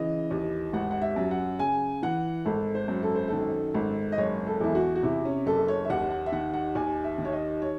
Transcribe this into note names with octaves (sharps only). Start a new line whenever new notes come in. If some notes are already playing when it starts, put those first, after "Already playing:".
Already playing: C#3 E3 D#5
D#2
G#1 F#5
F#5
E5
F#2
F#5
C#3 G#5
E3 F#5
G#1 A4
C5
F#2
A4
C5
D#3 A4
G#1
D#5
F#1 C#5
A4
E2 E4
F#4
F#4
C3 E4
C#4
F#1 A4
C#5
E5
D#2 F#5
F#5
E5
D#3 F#5
F#5
D#2 G#5
E5
D#3
C#5
D#5
C#5